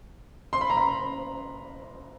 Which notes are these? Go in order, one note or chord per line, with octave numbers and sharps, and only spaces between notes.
C6
B5
A#5
B5